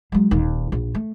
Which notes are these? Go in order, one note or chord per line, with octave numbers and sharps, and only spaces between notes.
F#3 G#3
D#1 D#2
A#1
A3